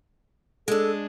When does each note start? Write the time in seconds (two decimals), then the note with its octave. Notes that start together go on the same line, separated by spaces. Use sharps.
0.68 G#3 D4 A4